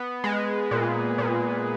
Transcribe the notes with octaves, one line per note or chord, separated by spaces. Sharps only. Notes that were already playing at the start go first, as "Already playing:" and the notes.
Already playing: B3
G#3
A#2
A#2